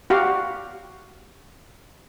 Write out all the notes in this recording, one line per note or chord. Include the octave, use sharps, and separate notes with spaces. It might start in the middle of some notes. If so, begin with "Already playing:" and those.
F#4 G4 F5